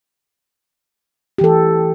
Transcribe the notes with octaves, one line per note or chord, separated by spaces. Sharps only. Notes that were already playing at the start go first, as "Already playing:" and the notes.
E3 G4 A4